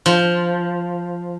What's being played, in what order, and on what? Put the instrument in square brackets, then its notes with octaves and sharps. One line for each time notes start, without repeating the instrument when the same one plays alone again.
[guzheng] F3